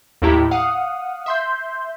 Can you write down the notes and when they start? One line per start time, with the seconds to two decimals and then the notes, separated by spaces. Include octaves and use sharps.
0.22 D#2 A2 E4 G4 A#5
0.51 F5 F#5 D#6
1.26 E5 C6 G6